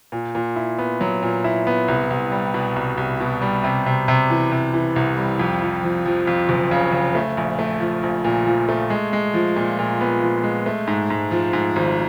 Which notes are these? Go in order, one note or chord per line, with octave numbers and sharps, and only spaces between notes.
A#2
A#2
E4
B3
F#3
A#2
E4
B3
C2
C2
G3
B2
C2
C2
B2
G3
C3
C3
C3
E3
C3
E3
C2
G3
F2
F3
F3
F3
F2
F#1
C#3
C#3
A3
A#1
A3
F3
A#1
A#2
F3
A3
G#3
G#3
F3
A#2
A#2
B3
F3
G#3
A3
G#2
G#2
F3
G#2
G#1